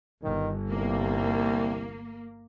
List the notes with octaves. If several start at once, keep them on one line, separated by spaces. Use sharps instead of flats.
G1 D#3
C2 A#3